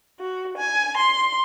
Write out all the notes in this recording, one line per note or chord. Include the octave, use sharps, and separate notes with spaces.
F#4
G#5
C6